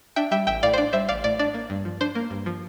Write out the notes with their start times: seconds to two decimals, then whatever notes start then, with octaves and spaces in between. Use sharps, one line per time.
0.16 D4 E5 G5
0.31 G3 E5 G5
0.47 A1 E5 G5
0.63 A2 D5 F5
0.73 C5
0.78 D4 D5
0.93 G3 C5 E5
1.08 A1 D5 F5
1.24 A2 D5
1.39 D4 D5
1.54 A#3
1.70 G2
1.85 F3
2.01 D4 C5
2.15 A#3
2.30 G2
2.46 F3